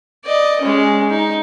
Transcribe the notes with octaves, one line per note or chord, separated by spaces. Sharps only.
D5 D#5
G#3 C#4
D#4